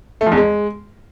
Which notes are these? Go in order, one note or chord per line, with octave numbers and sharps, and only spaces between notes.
A3
F3
E2
G#3